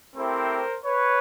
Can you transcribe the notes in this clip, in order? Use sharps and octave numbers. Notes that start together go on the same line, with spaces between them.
A3 C4 E4 G4 A#4 C5
B4 C#5